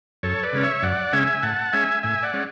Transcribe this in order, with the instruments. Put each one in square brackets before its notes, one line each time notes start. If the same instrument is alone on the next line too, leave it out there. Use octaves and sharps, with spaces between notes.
[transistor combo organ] F#2 A4 C#5
B4 D5
C#3 G#3 C#4
C#5 E5
F#2 D5 F#5
C#3 G#3 C#4 E5 G#5
A2 F#5 A5
G#3 C#4 E5 G#5
A2 E5 G#5
D5 F#5
G#3 C#4